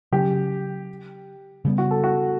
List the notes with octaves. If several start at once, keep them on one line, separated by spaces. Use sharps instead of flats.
C#3 F#3 C#4 G4
C#3 G3 B3
F#4
A4
F#4